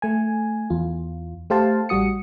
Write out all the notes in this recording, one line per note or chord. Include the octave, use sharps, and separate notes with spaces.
A3 G#5
E2 F4
A3 G4 C5 F5 A5
A1 G3 F#4 D#6 C#7